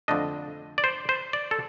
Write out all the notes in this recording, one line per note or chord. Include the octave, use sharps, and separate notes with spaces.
F2 D3 A3 D4 D#5
D5
C5
C5
D5
A4